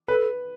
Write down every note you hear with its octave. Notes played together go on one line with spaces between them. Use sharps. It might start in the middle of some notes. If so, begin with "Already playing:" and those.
A4 B4